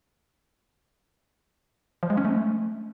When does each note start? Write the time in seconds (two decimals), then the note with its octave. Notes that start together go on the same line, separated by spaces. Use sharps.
2.03 F3
2.10 G#3
2.17 C#4
2.25 A3